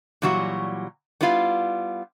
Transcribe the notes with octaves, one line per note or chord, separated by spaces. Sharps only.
A#2 E3 F#3 G3 F#4
G3 B3 E4 F4 F5